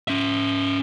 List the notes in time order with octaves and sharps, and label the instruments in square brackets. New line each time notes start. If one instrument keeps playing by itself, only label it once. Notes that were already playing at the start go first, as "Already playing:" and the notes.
[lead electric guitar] C#4 E5